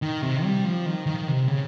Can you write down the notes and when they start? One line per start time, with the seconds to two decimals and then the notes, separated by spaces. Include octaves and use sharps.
0.02 D#3
0.23 C3
0.44 G3
0.65 F3
0.86 D#3
1.06 D#3
1.28 C3
1.48 C#3